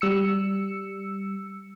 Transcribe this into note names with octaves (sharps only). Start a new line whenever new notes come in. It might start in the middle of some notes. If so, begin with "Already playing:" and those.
G3 E6 C#7